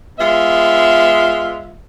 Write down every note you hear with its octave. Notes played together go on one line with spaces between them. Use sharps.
G#3 B3 F4 E5